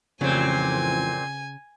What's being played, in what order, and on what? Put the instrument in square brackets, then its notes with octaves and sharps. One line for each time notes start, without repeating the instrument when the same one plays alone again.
[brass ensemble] A1 F2 [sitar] A#2 C4 [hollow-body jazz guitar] C#3 [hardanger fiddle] G#5